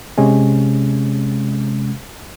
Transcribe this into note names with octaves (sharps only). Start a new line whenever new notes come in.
C3 G#3 C#4